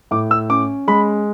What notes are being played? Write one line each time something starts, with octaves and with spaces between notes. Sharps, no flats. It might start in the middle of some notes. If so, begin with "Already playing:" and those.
A2 D6
E6
C#4 D6
G#3 B5